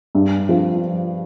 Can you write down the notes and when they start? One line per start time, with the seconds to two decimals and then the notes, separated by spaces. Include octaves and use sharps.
0.15 G2
0.49 F3